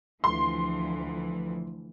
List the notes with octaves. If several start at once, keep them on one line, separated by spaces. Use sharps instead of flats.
D2 E3 F3 C6